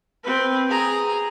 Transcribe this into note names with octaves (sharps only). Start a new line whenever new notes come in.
C4 B4
G#4 A#5